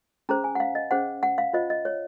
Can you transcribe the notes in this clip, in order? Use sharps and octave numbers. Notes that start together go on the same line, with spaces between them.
C#4 G#4 C5 A#5
G#5
F#5
F5
D#5
C#4 G#4 C5 F#5
F#5
F5
F4 C5 D#5
D#5
C#5